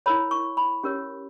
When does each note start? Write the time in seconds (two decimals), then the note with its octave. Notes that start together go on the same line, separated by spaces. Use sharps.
0.06 E4 A#4 C#5 B5
0.31 C#6
0.57 B5
0.83 C#4 G4 A#4 C#5